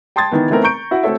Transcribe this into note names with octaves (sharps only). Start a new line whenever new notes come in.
G5 A5 C6 D#6 G#6 A6
D#3 E3 B3
E3 A3 B3 C4 D#4 A#4
A#5 C#6 G6 D7
E4 F#4 F#5
A3 C4 F#4 A4 C#5 E5